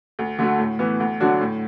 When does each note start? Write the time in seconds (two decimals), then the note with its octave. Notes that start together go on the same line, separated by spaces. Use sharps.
0.19 D2
0.39 D3 A3 F#4
0.59 A2
0.79 E3 B3
1.00 D2
1.20 D3 F#3 D4 F#4
1.41 A2